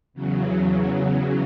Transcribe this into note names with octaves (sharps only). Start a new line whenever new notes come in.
E2 C#3 F#3